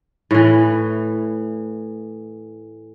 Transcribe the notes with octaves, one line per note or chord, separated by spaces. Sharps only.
A2 E3